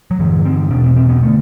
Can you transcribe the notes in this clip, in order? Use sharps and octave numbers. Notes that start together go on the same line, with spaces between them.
F#3
G2 D3 E3
C4
E2 B2 D4
C4
C4
B3
D3 A3